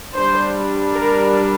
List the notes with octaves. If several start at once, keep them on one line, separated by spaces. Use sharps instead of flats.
G3 D4 C5
A#4